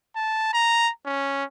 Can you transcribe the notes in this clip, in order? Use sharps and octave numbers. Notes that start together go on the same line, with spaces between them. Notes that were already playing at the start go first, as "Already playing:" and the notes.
A5
A#5
C#4